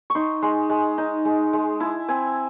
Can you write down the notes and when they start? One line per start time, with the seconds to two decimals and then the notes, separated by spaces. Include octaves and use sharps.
0.10 C#6
0.15 D#4 C6
0.42 G#3 C6
0.70 G#3
0.98 D#4
1.25 G#3
1.53 G#3
1.80 E4 A5
2.08 C4 G#5